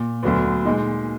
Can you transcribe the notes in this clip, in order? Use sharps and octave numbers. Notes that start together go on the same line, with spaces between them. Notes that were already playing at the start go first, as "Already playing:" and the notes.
Already playing: A#2
D2 D3 F#3 B3
A#2 G#3 D#4